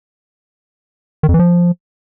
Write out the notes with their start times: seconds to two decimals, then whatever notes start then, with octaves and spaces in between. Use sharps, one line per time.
1.23 D#3
1.29 F2
1.34 E3
1.39 F3